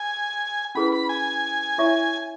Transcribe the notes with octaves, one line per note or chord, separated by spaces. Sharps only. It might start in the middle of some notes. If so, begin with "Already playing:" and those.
Already playing: G#5
C#4 E4 G#4 B4 B5
B5
G#5
E4 C#5 E5 C#6